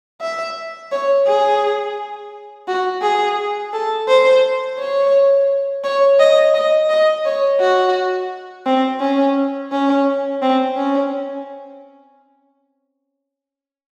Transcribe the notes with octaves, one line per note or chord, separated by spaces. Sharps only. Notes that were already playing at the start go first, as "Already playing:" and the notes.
E5
C#5
G#4
F#4
G#4
A4
C5
C#5
C#5
D#5
D#5
D#5
C#5
F#4
C4
C#4
C#4
C4
C#4